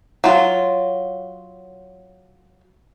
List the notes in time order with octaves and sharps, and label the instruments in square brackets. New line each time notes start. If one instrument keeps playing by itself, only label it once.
[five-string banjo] F#3 F4